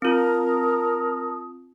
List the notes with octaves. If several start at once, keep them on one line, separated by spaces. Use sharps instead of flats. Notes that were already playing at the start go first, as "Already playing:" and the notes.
C4 F4 A#4 A5 D#6